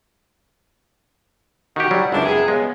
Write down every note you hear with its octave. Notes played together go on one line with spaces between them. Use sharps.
D#3 F#4 G4
F#3 G3
C#2 F#2 D4 E4
C3 B3 G#4
C#3 G#3 B3